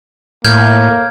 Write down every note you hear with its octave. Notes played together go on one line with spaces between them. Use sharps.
A2 A#3 F6 G6 G#6